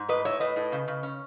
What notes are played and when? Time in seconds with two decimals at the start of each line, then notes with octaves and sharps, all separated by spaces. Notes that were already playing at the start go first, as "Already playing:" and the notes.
Already playing: G#2
0.08 A2 B4 D#5
0.25 A2 C#5 E5
0.40 A2 B4 D#5
0.56 A2
0.72 C#3
0.88 C#3
1.03 C#4